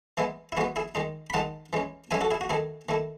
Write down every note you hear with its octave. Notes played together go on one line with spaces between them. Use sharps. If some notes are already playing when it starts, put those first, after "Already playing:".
E3 G#3 B3 E4
E4
E3 G#3 B3 F#4
E4 G#4
D#3 G#3 D#4
B5
D#3 G#3 D#4 F#5 A5
E3 G#3 C#4
E3 G#3 C#4 E5 G#5
F#4 A4
E4 G#4
F#4
D#3 A3 E4 G#4
D#3 A3 E4